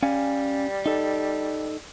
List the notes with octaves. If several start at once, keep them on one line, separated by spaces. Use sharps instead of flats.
G3 C#4 F5 G#5
D#4 A4